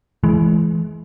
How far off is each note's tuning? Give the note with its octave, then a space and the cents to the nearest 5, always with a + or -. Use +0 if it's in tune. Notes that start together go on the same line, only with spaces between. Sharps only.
E3 +10 G#3 +30